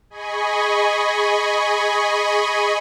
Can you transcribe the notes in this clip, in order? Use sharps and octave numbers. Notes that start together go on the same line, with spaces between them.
G#4 D#5 G#5 B5 C#6